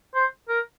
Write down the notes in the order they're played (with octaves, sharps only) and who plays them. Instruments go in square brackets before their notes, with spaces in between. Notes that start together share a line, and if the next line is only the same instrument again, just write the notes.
[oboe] C5
A#4